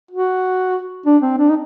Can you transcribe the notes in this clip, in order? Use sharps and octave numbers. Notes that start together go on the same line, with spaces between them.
F#4
D4
C4
D4
D#4